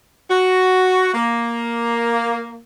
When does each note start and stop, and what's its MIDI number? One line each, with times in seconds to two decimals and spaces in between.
0.30 1.10 66
1.14 2.58 58